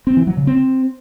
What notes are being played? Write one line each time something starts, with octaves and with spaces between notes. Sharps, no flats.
C4
E3
F#3
C#3
C4